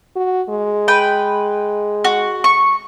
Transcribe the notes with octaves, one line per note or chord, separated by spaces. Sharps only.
F#4
G#3
B4 G5
F#4
C#6